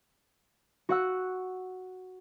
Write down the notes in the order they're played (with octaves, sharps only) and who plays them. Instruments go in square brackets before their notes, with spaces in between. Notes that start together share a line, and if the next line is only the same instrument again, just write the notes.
[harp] F#4 F#5 E6